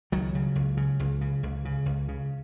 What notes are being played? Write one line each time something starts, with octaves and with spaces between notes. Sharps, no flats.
C#2 D#3 F#3
C#3
C#2
C#3
C#2
C#3
C#2
C#3
C#2
C#3